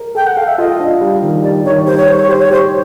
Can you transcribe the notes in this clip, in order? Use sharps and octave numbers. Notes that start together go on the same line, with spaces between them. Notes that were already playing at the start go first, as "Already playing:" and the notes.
Already playing: A#4
A4 G5
F#5
A4 F5
E5
F4 D#5
D4
G3
D#3
G3 D5
D#3 C#5
G3 C5
C#5
G4 C5
C#5
G4 C5
C#5
G4 C5